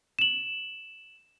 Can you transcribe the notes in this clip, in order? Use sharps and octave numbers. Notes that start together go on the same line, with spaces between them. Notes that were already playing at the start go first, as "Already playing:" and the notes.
E7 F#7